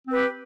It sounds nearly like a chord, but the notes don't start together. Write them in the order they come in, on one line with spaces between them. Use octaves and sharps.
C4 B4 G4